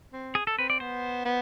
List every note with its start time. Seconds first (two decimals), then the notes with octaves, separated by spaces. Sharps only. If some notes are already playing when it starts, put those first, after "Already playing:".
0.13 C4
0.35 G#4
0.47 A4
0.58 C4 B4
0.70 D5
0.80 B3 C5
1.26 B3